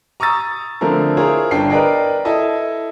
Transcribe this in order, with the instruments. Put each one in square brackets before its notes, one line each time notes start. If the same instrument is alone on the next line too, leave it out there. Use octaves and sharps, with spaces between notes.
[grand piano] A#5 C#6 D#6 E6 A6
D3 F3 A3 C4 A#4
E4 F4 G#4 A#4 C5 C#5
G1 D4 G5 C7
A#4 B4 D5 D#5 G5
E4 A4 D#5 A5